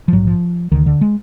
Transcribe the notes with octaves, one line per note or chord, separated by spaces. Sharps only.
F3
A#1 G#2 F#3
F3
D2 D3 D#3
D3
G#3